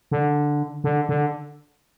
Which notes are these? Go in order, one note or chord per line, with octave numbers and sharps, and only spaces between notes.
D3
D3
D3